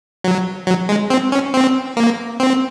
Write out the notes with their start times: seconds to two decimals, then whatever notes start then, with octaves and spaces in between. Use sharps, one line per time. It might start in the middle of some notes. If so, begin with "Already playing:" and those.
0.24 F#3
0.67 F#3
0.89 G#3
1.10 C4
1.32 C#4
1.54 C4
1.97 A#3
2.40 C4